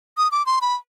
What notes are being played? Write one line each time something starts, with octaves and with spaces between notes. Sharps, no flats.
D#6
D6
C6
B5